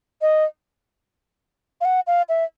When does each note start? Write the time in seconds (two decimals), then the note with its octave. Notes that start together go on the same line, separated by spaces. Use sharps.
0.22 D#5
1.81 F5
1.85 F#5
2.07 F5
2.29 E5